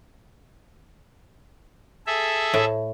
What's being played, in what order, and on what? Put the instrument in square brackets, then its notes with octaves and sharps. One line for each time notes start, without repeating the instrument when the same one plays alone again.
[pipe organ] G#4 A4 E5
[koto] A2